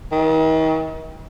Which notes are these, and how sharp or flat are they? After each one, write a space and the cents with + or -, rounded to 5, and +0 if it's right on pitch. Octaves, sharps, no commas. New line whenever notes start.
D#3 +40